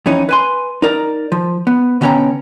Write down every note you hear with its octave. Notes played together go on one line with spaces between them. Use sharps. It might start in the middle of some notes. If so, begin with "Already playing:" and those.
F2 E3 C#4 D#4
B4 G#5 C6
D#4 A#4 D5
F3
B3
B2 D3 B3 C#4 G5 A#5